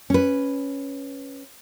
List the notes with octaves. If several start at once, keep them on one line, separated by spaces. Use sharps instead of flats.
C#4 B4